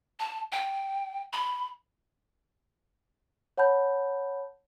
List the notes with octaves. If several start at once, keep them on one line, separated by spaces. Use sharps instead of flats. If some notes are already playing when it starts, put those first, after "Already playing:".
A5
G5
B5
C#5 F#5 A5 B5 G6